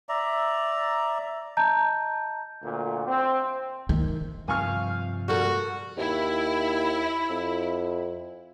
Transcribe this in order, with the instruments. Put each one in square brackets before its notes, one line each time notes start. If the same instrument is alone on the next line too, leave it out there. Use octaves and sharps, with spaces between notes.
[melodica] D5 E5 A#5
[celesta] D#5 A5 A#5 G6
[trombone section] D2 A#2
C4
[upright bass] D#3
[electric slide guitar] G2 C3 F3 [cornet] F5 [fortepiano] G#5 C#6 F6
[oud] G3 A#3 A4 [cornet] F#4
[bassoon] D#2 [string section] E4
[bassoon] F2